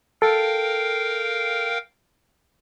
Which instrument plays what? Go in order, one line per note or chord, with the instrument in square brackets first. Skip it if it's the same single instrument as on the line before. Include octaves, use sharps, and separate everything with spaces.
[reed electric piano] A4 [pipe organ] A#4 F5 G5